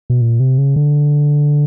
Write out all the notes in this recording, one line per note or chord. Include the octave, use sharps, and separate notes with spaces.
B2
A#2
C3
C#3
D3